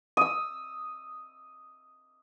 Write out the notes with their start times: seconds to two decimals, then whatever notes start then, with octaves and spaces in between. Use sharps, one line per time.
0.17 D#6 E6